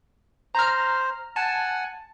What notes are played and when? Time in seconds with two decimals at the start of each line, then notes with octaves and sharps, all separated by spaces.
0.55 C5 A#5 F6
1.36 F#5 G#5 A5